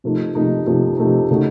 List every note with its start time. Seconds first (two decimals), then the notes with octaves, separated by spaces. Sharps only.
0.04 C3 F3 A3 D#4
0.35 C3 F3 A3 D#4
0.66 C3 F3 A3 D#4
0.97 C3 F3 A3 D#4
1.31 C#3 A3 D#4 F#4